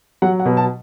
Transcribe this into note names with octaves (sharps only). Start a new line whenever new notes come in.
F#3 F#5
F#5
B2
A5